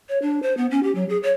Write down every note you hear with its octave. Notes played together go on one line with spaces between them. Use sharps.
C#5
D4
C5
B3
C#4
G4
F#3
G#4
C#5